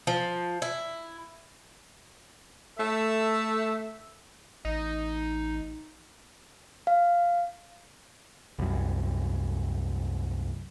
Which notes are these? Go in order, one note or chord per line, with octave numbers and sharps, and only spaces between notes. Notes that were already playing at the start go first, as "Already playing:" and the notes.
F3
E4
A3 A4 E5
A1 D#4
F5
C2 F#2